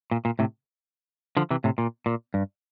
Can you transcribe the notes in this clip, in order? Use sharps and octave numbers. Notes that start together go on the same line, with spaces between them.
A#2
A#2
A2 C3
D3 F3
C3 E3
A2 C3
A#2
A#2
G2